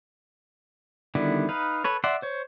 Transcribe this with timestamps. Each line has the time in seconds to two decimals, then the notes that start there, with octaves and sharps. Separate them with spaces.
1.15 D3 D#3 G3 B3 E4
1.49 D#4 B4 F5
1.84 A4 B4 C#5
2.04 D5 E5 F#5 C6
2.22 C5 C#5